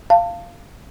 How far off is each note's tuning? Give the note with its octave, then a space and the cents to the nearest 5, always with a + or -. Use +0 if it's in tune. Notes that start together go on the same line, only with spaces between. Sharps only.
F5 -15 A5 +25